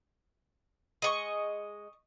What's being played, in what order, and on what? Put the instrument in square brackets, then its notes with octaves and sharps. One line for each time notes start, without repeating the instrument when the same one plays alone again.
[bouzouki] G#3 [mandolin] D#5 C#6